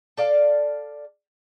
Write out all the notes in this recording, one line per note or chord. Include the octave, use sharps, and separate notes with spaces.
A4 D5 F5 A5